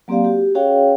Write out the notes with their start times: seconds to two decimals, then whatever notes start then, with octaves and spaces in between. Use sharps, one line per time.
0.08 F#3 A#3 C4 G4 D5 F5
0.24 F#4 G4
0.55 C#4 F#4 G#4 C#5 F5 G5